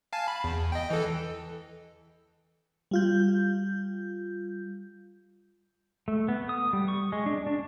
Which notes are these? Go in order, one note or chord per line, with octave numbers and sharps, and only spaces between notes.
F5 G#5 A5
B5
E2
D#5 G5
E3 A4
G3 F4 G6
A3
B3
D#6
G3
C#6
G#3
D4
D4